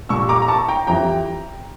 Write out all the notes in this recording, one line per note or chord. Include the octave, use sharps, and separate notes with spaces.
A#2 G3 C#6 E6
A#5 D6
A#5
A5 C#6
G5 A#5
F2 E3 G3 G5 A#5